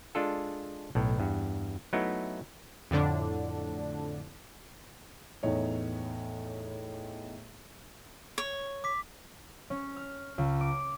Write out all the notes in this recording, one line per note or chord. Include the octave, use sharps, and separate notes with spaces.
G#3 D4 F4 A4
B1 A2
E2 G2
F#3 A3 B3 D#4 E4
F2 A2 D3 D4
E2 A2 D#4 C#5
C#5
D6 B6
C#4
F6
C#2
D6